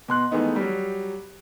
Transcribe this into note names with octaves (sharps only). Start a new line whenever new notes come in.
B2 C6 F#6
D#3 E3 G#3 A3 B3 D#4
F#3 G3